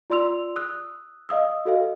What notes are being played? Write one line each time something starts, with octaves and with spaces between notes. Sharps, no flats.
F4 D5 C6 E6 F7
D#6 E6 F#6
D#5 F5 D#6 E6
F#4 A4 D#5 F5